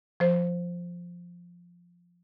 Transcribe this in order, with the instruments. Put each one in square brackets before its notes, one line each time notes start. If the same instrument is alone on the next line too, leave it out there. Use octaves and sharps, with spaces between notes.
[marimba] F3 C5